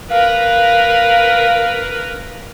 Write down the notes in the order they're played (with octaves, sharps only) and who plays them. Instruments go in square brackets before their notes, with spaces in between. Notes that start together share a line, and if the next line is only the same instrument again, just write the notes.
[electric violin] A#4 B4 [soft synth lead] F5